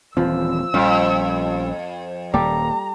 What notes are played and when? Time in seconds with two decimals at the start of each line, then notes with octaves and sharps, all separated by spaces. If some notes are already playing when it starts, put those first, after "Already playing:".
0.17 D#1 E3 F3 C4 E6
0.74 A#1 F2 G3 C#4 F4
2.34 D#1 G3 A#3 G4 A4 A#5